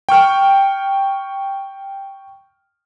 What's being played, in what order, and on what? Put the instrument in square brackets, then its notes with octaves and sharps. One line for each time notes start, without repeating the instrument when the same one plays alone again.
[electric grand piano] G5 C#6 F6